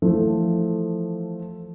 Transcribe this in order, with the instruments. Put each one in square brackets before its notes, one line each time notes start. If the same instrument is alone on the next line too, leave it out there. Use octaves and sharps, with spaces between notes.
[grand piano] E3 F3 A3